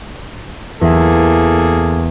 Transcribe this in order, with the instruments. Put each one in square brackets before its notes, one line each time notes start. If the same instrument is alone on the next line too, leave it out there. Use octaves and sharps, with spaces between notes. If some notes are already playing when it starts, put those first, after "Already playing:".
[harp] E2 E5 [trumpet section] A#3 G#4 A4